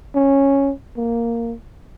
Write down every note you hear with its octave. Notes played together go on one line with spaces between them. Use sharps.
C#4
A#3